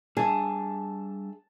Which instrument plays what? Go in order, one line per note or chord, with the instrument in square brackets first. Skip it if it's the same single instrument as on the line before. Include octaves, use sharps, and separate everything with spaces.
[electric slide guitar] G3 D4 E5 [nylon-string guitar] G#4 [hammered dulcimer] A5